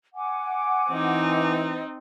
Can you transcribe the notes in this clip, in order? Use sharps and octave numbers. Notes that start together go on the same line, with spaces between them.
F#5 G#5 D6
E3 C4 D#4